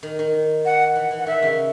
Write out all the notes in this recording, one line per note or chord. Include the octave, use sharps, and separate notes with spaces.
D#3
D#3
F#5
E3
E3
F#5
D#3 E5
C#3